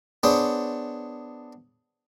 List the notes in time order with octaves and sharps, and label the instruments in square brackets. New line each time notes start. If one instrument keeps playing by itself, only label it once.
[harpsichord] B3 D4 G#4 C5 C#5